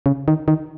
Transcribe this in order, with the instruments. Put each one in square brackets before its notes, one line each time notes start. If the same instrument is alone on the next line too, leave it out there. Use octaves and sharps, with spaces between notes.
[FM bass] C#3
D#3
D#3